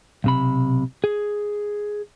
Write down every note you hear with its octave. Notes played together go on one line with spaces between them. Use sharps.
B1 C3 B5
G#4